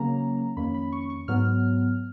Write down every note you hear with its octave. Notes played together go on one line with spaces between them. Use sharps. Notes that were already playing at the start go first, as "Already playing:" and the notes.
Already playing: C#3 F#3 A#3 C#4 A#5
F2 D#3 A#3 C#4 B5
B5
C#6
C#6
G#2 F#3 B3 F6